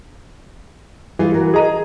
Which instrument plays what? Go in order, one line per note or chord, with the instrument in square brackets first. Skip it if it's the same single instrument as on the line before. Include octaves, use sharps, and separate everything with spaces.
[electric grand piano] E3 [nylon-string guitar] G3 F4 G#4
[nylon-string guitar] F#4 A#4
[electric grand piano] G#4 A#5 D#7 [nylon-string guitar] A4 D#5